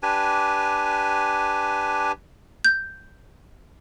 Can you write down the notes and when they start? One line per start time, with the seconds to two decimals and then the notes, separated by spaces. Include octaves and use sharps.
0.03 D4 G4 B4 G#5
2.65 G6